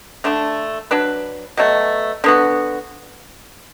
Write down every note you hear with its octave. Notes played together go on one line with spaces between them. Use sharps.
D3 A3 D4
F#3 D4 B4
B2 F#3 A3
D3 B3 F#4